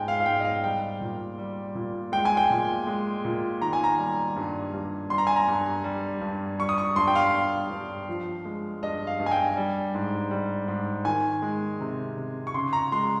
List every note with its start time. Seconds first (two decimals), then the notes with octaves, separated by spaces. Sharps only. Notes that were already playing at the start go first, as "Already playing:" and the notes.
Already playing: G#2 G#3 G5 G#5
0.08 F5
0.20 F5
0.26 G#2 G5
0.40 D#5
0.44 F5
0.64 G3 G5
1.01 A#2
1.38 G3
1.75 A#2
2.12 G#3 G5
2.25 G#5
2.37 G5
2.50 A#2
2.87 G#3
3.25 A#2
3.62 D#3 A#5
3.73 G#5
3.84 A#5
3.98 G3
4.36 G2
4.73 G2
5.10 G3 C6
5.18 A#5
5.27 G#5
5.36 A#5
5.48 G2
5.84 G3
6.21 G2
6.59 G3 C#6
6.69 D#6
6.78 C#6
6.96 G2 C6
7.08 G5
7.15 F5
7.34 G3
7.70 G2
8.09 F3
8.45 G#3
8.83 G2 D#5
9.07 F5
9.20 G2
9.26 G#5
9.31 G5
9.57 G3
9.95 G#2
10.31 G3
10.68 G#2
11.05 D#3 G#5
11.42 G#3
11.81 C3
12.17 C3
12.47 C#6
12.54 C#3 C6
12.73 A#5
12.92 G#3 C6